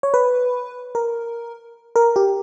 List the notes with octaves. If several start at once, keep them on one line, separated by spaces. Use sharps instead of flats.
C#5
B4
A#4
A#4
G4